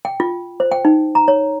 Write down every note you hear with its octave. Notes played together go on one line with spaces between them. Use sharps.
G5
F4
C5
G5
D#4
A#5
C#5